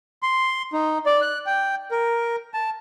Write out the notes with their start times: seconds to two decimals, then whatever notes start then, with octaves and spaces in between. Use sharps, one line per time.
0.23 C6
0.73 D#4
1.06 D5
1.21 F#6
1.46 G5
1.91 A#4
2.54 A5